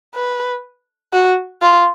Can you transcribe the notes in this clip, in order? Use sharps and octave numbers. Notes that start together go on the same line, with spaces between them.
B4
F#4
F4